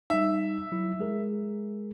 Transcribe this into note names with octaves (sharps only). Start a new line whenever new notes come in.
G3 D#4 E5
F#3 E4
G#3 G#4 A#4